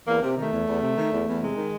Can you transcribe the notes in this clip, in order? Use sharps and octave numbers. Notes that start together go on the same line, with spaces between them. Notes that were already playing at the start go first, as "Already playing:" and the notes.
E2 A#3
C3
D#3 A3
E2
E2
C3
D#3
E2
E2
C3 G#3
D#3